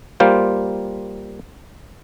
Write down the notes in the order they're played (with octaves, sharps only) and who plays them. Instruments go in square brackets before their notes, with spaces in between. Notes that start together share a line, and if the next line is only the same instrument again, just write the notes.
[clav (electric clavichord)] G3 A#3 F4 C5